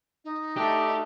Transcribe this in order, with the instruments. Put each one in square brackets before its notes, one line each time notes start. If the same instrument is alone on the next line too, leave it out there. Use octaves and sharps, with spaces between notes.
[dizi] D#4
[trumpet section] A3 D4 [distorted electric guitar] G4